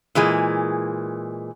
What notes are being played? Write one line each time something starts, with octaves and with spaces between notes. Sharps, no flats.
A#2 E3 G#3 G#4